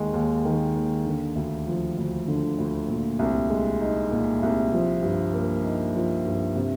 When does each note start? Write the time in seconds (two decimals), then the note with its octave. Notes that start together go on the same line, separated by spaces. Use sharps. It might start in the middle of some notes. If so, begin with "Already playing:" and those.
Already playing: D#2 D#3 G#3
0.13 D#2
0.45 D#3
0.75 D#2
1.06 D3
1.36 D2
1.67 F3
1.98 D2
2.28 D3
2.58 D2
2.89 A#2
3.19 C2
3.50 G#3
3.80 D#4
4.11 A#2
4.43 C2
4.73 F3
5.03 G2
5.33 A#3
5.64 D#4
5.95 F3
6.25 G2
6.55 C3